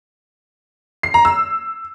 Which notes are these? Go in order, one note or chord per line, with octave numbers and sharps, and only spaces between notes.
C7
A#5
E6